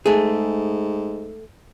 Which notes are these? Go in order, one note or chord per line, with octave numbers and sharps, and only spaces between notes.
G#2 A3 G#4